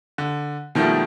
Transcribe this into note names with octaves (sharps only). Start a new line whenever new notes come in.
D3
B2 D#3 F3 G3 A3 A#3